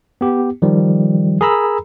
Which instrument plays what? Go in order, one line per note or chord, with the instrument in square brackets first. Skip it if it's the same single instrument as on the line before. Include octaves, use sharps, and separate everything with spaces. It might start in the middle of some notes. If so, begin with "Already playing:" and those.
[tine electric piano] B3 G4
D#3 F3 G3
G#4 A#4 A#5 B5 E6